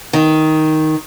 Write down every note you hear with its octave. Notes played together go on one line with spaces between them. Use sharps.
D#3